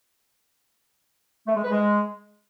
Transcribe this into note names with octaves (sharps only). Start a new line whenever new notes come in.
A3
G#3
B4
G#3